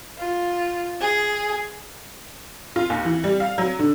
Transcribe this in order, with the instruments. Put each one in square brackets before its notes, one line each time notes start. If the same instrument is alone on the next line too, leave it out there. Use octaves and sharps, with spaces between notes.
[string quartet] F4
G#4
[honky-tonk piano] F4
D#2
E3
G3
F5
F#3
D3